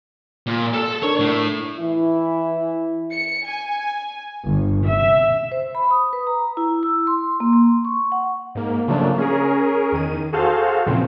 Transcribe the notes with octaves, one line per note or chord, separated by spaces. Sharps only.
A#2
A4 A5
D4 A#4 C#5
A2
E3 E4
C#7
G#5
G1
E5
C5
B5
D#6
B4
A#5
E4
E6
C6
A#3
C6
C#6
F#5
G#2 A#3
C#3 F3 F#3 A3 A#3 D4
C#4 G#4 A#4
E2 D#3 D#7
F#4 G#4 A4 C5 F5
E2 A#2 C#3 E3 F3 C4